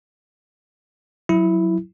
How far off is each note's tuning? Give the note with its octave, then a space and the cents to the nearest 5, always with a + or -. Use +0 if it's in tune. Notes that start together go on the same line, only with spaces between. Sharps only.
F#3 -10 E4 +0